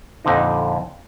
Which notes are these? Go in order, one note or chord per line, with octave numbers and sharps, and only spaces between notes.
F2 A#2 D3 D#4